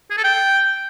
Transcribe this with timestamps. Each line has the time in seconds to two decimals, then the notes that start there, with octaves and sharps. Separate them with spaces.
0.11 G#4
0.17 A4
0.24 G5